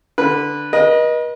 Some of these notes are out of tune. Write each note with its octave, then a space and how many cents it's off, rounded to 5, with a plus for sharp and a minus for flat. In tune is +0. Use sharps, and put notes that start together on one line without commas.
D3 +0 B4 -10
B4 -45 D#5 +0